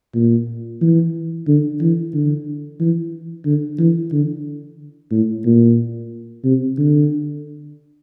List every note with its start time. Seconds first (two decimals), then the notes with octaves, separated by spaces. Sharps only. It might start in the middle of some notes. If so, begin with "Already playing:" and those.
0.15 A#2
0.81 E3
1.48 D3
1.81 E3
2.14 D3
2.80 E3
3.46 D3
3.79 E3
4.13 D3
5.11 A2
5.45 A#2
6.44 C3
6.78 D3